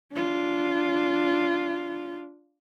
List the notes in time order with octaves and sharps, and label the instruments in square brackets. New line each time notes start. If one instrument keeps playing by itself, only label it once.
[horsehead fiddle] D4 F4